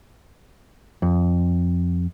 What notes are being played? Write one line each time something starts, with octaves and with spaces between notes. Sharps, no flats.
F2